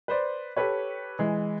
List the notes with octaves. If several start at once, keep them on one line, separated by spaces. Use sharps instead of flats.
B4 C5 D5
G4 A4 B4 C#5
E3 G#3